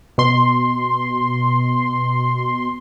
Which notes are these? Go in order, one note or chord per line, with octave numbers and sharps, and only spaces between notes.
B2 C6